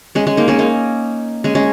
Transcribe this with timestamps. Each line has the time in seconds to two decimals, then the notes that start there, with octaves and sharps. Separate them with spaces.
0.15 G#3 C#4
0.27 G#3 C#4
0.37 A#3 D#4
0.48 G#3 C#4
0.59 A#3 D#4
1.44 G#3 C#4
1.55 G#3 C#4